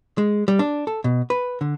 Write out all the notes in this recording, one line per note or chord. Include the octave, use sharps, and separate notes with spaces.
G#3
G3
D4
A4
B2
B4
D3